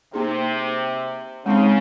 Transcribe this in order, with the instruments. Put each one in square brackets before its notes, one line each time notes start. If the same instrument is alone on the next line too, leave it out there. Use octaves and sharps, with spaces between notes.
[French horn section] C3 [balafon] A#3 D#4 G#4
[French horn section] C#3 [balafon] G#3 C4 D#4